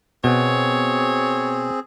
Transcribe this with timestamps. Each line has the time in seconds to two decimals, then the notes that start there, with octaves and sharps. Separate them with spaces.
0.24 B2 C4 G#4 C#5